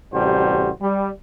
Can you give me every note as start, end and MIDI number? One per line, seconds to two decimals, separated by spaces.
0.13 0.70 33
0.13 0.70 48
0.13 0.70 55
0.13 0.70 66
0.13 0.70 72
0.81 1.10 55